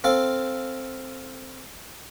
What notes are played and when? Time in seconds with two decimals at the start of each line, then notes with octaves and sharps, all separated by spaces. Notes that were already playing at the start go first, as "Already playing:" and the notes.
0.04 C4 A4 F5